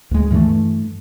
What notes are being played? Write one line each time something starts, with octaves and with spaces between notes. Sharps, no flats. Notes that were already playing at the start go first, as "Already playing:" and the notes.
D2 G#3
G2 E3 F3 A3